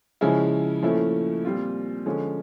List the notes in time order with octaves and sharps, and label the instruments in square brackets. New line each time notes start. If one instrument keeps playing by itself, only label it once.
[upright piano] C#3 F3 G#3 C#4 E4
A#2 F3 A3 C#4 E4
A#2 G3 C4 F4
D3 F3 G#3 C#4